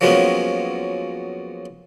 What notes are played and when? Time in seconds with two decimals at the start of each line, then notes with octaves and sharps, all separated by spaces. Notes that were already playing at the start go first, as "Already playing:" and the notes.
0.01 F3 F#3 G#3 A#3 B3 C#4